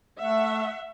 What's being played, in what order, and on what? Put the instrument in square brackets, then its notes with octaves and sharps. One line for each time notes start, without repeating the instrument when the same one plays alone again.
[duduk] A3 [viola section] E5 F#5